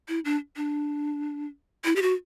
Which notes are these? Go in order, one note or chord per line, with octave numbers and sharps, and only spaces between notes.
E4
D4
D4
E4
G4
F#4